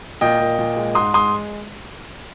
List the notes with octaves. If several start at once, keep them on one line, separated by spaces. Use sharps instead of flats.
A#2 D#5 G5
A#2
A#2
G#3
G#2 C6 D#6
G#3 C6 D#6